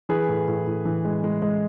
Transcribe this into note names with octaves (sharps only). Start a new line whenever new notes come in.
E3 G#4 B4
A2
A2
A2
E3
G#3
G#3
G#3